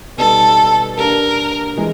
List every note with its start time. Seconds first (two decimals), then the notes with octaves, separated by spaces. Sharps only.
0.17 B2 G3 B3 D#4 A4
0.97 A#3 D4 G4 A#4
1.77 E3 G#3